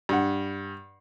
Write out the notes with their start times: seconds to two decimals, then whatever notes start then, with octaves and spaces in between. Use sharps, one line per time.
0.09 G2 F#5